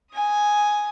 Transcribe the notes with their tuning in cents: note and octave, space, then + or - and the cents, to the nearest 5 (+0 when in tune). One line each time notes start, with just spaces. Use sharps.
G#5 +0 D#6 +0